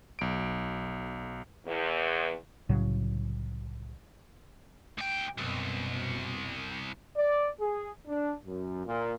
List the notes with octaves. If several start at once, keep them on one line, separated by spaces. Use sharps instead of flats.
B1 D7
E2
C2 A2 C#3 F#3
D2 G5
C2 F#2 B2
D5
G#4
D4
F#2
A#2